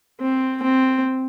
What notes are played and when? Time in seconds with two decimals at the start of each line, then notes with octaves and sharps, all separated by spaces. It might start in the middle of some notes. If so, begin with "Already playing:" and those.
0.20 C4
0.62 C4